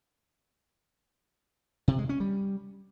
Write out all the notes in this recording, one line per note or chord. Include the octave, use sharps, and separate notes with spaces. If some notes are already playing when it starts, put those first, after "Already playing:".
C3
G#3
C#4
G3